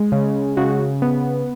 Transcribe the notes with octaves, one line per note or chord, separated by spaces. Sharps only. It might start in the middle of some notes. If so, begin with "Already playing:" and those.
Already playing: G#3
C#3
C#3 F#4
B3